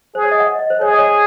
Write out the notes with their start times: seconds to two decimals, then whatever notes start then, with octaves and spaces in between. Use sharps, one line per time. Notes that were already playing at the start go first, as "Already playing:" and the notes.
0.15 G#4 C5
0.23 C#5
0.31 D#5
0.40 F#5
0.47 D#5
0.59 D#5
0.70 C5
0.80 G#4 C#5
0.90 D#5
0.99 C#5